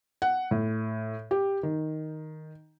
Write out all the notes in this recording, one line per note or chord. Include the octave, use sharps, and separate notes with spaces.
F#5
A2
G4
D#3